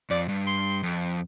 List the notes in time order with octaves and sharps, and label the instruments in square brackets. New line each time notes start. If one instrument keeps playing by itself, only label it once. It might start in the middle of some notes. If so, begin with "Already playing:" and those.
[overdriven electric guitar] F2 [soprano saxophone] D5
[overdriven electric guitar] G2
[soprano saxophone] C6
[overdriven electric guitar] F2